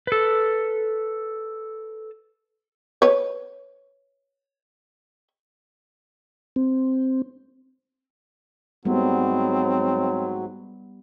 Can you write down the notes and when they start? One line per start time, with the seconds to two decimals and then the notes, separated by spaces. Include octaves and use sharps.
0.07 A4 B4
3.02 B4 C#5
6.56 C4
8.85 G#2 F#3 G3 B3 C4